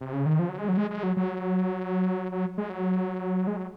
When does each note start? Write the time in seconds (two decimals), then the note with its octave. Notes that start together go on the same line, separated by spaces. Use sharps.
0.01 C3
0.13 C#3
0.26 D#3
0.39 F3
0.49 F#3
0.58 G#3
0.68 F#3
0.77 G#3
0.91 G#3
1.03 F#3
1.17 F#3
2.32 F#3
2.58 G#3
2.70 F#3
3.47 G#3
3.57 F#3